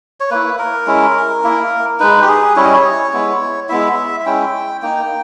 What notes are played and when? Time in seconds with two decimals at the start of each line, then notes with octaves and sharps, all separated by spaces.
0.20 C#5
0.31 A#3 E4 B4
0.59 A#4
0.87 G#3 C#4 E4
1.44 A#3 E4
2.00 G#3 D#4 B4
2.22 G4
2.28 G#4
2.56 G3 C#4 E4 C#5
2.64 D#5
2.74 C#5
3.13 G#3 B3 E4
3.69 G#3 B3 E4 E5
4.20 E5
4.25 G#3 C#4 E4 G5
4.82 A#3 D#4 G5